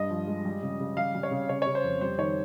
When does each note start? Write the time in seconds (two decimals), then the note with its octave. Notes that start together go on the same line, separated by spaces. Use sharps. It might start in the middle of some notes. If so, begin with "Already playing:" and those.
Already playing: G2 D#5
0.10 F3
0.27 G#3
0.45 G3
0.63 C#3
0.80 C#3
0.97 G3 F5
1.15 G3
1.23 C#5
1.31 C#3
1.49 C#3 C#5
1.62 C#3 C#5
1.75 C5
1.83 F2
2.01 G3 C5
2.18 D#3 C#5